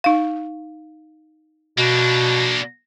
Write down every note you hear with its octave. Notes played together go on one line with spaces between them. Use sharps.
D#4 F5
B2 A#3 D4